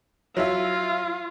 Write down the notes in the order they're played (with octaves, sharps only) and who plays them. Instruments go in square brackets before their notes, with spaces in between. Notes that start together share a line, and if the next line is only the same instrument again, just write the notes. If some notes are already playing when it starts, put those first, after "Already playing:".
[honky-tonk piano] F#3 E4 E5 [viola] F4